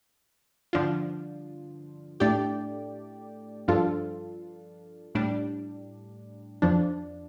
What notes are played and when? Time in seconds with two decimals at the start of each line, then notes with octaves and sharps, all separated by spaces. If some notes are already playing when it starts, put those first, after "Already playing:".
0.73 G2 D3 F3 D4 F4
2.20 A2 A3 D4 G4 D5
3.68 G2 F3 D4 F4 A4
5.15 A2 G3 D4
6.62 F2 F3 D4